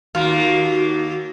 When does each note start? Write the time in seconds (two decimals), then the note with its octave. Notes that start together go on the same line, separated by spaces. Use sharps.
0.15 D#2 A#3 F4 F#4